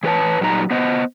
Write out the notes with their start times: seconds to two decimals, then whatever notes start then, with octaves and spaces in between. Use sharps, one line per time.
0.03 E3 G#4 B4 C#5 A5
0.41 A#2 F#3 G3 D#4 A#4 A#5
0.71 B3 C5 D#5